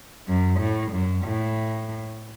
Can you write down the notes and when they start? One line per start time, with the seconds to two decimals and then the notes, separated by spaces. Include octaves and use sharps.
0.28 F#2
0.60 A2
0.92 F#2
1.25 A2